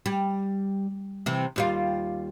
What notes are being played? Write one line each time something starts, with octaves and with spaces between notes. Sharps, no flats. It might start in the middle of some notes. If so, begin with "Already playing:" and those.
G3
C3 E3
D#2 G3 F4